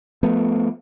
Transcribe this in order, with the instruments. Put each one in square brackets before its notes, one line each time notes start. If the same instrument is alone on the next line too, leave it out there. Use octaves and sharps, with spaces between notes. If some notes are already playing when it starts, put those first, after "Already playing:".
[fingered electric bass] F3 A3 B3